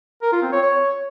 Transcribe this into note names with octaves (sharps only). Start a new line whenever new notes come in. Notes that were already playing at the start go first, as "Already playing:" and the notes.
A#4
F4
C4
C#5
C#5